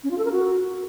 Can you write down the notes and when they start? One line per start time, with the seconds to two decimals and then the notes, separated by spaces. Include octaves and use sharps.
0.04 C#4
0.11 F4
0.18 A4
0.25 A#4
0.32 F#4